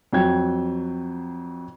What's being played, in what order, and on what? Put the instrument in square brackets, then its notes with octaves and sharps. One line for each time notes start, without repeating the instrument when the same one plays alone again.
[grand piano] F2 F#3 G5 G#6